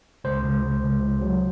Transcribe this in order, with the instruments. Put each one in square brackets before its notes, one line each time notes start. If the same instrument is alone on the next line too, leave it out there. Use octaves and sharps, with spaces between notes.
[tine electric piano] C#2 C5
C#2
C#2
C#2
C#2
F#3